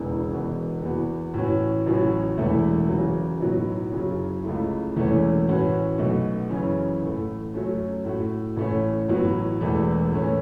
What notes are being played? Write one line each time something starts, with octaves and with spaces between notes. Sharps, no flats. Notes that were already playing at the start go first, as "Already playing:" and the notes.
Already playing: E1 E2 C#3 E3 B3
E1 E2 B2 B3
E2 E3 B3 F#4
A2 E3 C#4 F#4
A1 A2 F#3 C#4
E1 E2 E3 A3 E4
E2 C#3 F#3
B1 A2 F#3 B3
F#1 F#2 C#3 F#3
C#2 C#3 A3 E4
E1 E2 E3 A3 C#4
A2 E3 C#4 F#4
B1 B2 A3
F#2 C#3 E3 C#4
A1 A2 A3
F#2 F#3 A3 C#4
A2 A3 F#4
A1 A2 A3 C#4
A1 A2 F#3 B3
E1 E2 E3 A3 E4
A2 E3 A3 C#4